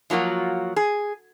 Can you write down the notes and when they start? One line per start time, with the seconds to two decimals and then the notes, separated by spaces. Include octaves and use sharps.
0.10 F3 F#3 A#3 F4 F#4
0.76 G#4